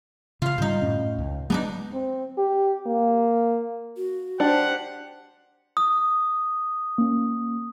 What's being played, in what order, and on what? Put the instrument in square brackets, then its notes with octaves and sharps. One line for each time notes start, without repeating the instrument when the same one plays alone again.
[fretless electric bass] C#3 [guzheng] F4 F5
[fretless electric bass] G#2 D3 G3 [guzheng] D#4 C5
[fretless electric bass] F#2 A2 C#4
C#2
[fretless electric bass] F#3 G#3 A#3 [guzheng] B3 D4 D#4
[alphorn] C4
G4
A#3
[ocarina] F#4
[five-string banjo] D4 [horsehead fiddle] G4 C5 [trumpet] F#5
[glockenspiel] D#6
[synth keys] A#3 C#4